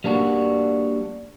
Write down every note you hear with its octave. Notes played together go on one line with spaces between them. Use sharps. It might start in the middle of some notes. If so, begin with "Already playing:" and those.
G3 A#3 D4 F#4